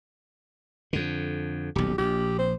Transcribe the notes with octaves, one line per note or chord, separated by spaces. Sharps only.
F2 D3
D#1 B1 G4
A#1 G4
C5